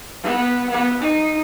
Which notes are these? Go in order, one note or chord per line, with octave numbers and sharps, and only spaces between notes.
B3
B3
D#4